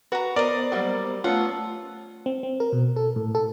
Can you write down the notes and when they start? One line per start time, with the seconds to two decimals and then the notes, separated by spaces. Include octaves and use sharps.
0.12 F#4 B4 A#5
0.36 B3 A#4 C5 D5 D#5 A#5
0.72 F#3 G3 A#3
1.24 A3 B3 C#4 F4 F#5 A5 E6
2.26 C4
2.43 C4
2.60 A#4
2.73 B2
2.96 A4
3.16 A2
3.35 A4